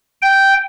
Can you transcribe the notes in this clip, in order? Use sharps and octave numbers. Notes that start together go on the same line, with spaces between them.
G5